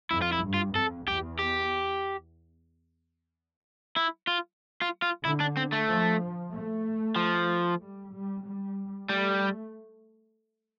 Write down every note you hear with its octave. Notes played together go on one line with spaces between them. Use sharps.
F2 E4
F4
E4
G2
F4
F2 A4
E2 G4
G4
E4
F4
F4
F4
D3 E4
D4
C4
A3
F3
A3
F3
G3
G3
G3
G3 A3